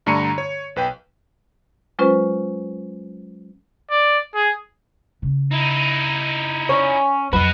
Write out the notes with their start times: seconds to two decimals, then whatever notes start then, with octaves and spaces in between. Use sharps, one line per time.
0.06 G2 D3 A3 A#5 C#7 D#7
0.38 C#5
0.76 B1 B4 G5
1.99 F#3 G#3 C#4 F4 B4 C5
3.91 D5
4.35 G#4
5.22 C#3
5.52 D#4 E4
6.69 C#4
7.33 F2 F#3 F#4 B4 D#5